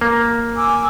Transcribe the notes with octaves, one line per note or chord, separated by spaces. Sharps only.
A#3
G#5 D6 E6